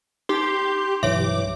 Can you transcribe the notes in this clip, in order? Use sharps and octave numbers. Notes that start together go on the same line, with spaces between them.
D#4 G4 C6
B1 G2 E3 C#5 E5 D6